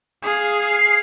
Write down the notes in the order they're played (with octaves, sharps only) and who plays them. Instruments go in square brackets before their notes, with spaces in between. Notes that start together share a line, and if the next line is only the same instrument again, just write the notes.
[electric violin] G#4 F5
[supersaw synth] C7